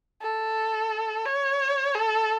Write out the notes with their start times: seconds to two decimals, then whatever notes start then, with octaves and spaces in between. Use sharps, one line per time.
0.22 A4
1.26 C#5
1.95 A4